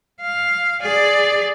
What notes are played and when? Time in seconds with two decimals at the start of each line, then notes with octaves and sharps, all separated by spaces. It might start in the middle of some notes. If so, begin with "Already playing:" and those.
0.21 F5
0.81 G#4 D5